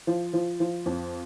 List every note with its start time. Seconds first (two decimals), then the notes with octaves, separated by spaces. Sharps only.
0.07 F3
0.33 F3
0.60 F3
0.86 F2